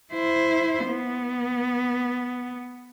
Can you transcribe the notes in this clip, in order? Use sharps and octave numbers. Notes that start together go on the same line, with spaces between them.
E4 C5
B3